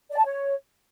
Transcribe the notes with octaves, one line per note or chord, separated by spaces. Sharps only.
D5
A5
C#5